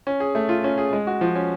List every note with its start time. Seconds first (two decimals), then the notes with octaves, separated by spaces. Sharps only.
0.07 C#4
0.20 G#4
0.35 A3
0.49 F4
0.64 C#4
0.78 G#4
0.92 G#3
1.07 F#4
1.21 F3
1.35 C#4